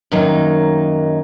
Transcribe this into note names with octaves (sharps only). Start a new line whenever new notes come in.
F#2 D#3 F#3 A#3 D#4